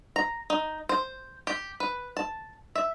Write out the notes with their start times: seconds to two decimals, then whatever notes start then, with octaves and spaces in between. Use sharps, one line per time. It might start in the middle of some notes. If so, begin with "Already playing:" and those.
0.16 A#5
0.50 D#4
0.89 C5
1.47 G4
1.80 B4
2.17 A5
2.76 E5